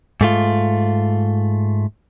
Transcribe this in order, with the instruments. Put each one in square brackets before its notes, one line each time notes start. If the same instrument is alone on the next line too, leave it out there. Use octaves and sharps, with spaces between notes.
[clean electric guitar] G#2 A3 F4